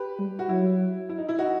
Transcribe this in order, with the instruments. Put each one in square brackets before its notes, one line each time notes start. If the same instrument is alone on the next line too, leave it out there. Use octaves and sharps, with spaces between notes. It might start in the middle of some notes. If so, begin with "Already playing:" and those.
Already playing: [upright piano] G4 B4
[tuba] G3
[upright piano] F#4
[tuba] F#3 [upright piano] E4
[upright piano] E4
D#4
E4
D#4 F#4